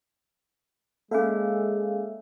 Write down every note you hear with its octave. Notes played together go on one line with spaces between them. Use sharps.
G#3 A#3 C#4 A4 E5 F5